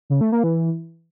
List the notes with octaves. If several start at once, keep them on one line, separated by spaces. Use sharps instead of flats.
C#3
A3
A#3
E3